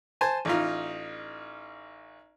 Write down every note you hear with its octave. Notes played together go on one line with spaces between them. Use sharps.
C5 G#5 A5
A1 D#4 F4